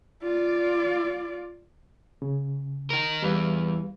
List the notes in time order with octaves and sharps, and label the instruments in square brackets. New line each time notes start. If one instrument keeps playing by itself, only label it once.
[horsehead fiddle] F4 D5
[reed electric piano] C#3
[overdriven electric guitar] D#4 A#4
[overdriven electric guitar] E2 [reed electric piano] G3 B4 F5